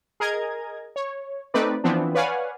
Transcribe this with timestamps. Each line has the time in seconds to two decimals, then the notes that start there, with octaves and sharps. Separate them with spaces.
0.20 G#4 A#4 D#5 A#5 G#6
0.96 C#5
1.54 A3 C4 D#4 B4 D5
1.84 E3 F3 B3 C4 D4
2.15 B4 C#5 D5 F5 F#5 G#5